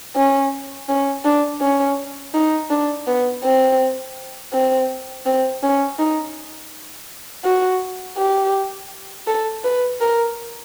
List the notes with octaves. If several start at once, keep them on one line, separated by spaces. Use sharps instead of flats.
C#4
C#4
D4
C#4
D#4
D4
B3
C4
C4
C4
C#4
D#4
F#4
G4
A4
B4
A#4